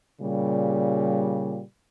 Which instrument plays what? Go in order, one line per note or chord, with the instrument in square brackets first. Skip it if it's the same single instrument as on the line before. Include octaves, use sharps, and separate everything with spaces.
[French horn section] A#2 C#3 G3